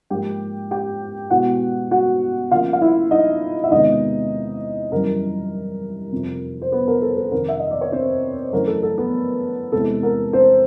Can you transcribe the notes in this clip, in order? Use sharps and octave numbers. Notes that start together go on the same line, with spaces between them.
G#2 F3 A#3 G4 G5
G4 G5
B2 G#3 B3 E4 F#4 F#5
F#4 F#5
C#3 F3 A#3 C#4 F4 F5
F5
E4 E5
D#4 D#5
E5
E2 C3 D#3 G#3 B3 D#4 D#5
F#2 C#3 E3 G3 A#4
F2 C3 F3
C5
B3 B4
A#4
A4
A4
F2 C3 D#3 A#4
E5
D#5
D5
C#5
C4 C5
F#2 C#3 E3 A3 C#4 A#4
A4
A4
B3 B4
E2 C3 E3 G#3 A4
A#4
C4 C5